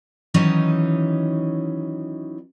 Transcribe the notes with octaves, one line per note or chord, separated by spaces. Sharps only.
D#3 E3 F#3 C#4 D#4